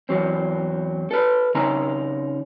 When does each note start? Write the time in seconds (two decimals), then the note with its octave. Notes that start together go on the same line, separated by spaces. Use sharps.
0.09 E2 F#3 C4
1.11 A4 B4
1.55 C#3 C4 D#4 A#5